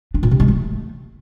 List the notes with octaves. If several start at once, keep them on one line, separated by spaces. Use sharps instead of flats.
D4
A#2
C3
G#3
A3